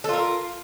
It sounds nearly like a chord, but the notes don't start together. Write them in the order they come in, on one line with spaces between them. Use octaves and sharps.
A4 F4 A#4